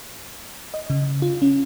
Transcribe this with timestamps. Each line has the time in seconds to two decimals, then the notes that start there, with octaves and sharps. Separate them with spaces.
0.74 D#5
0.90 C#3
1.22 F4
1.42 C#4